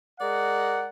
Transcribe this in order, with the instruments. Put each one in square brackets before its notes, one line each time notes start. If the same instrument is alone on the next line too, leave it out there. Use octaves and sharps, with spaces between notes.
[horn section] G#3 A#4 D5 F#5